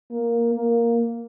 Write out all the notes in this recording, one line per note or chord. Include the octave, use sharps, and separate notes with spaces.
A#3
A#3